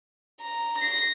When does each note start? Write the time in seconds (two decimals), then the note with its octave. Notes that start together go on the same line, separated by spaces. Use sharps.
0.40 A#5
0.78 A#6 C7